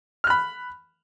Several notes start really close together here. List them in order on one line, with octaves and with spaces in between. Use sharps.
F6 F#6 B5